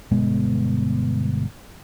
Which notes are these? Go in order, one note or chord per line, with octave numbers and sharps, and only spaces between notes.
G1 B2 G#3 B3